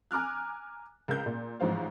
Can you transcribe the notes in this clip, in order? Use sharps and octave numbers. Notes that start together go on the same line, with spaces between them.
G#5 A#5 D6 F6 F#6
C#2 A#4 G6
A#2
A1 G#2 F3 C5 F5